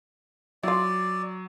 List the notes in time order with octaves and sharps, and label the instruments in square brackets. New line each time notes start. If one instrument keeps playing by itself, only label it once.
[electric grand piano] F#3 [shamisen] E4 F4 [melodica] D5